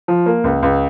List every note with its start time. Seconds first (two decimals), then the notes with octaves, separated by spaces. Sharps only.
0.08 F3
0.26 A#3
0.44 C#2
0.63 C#2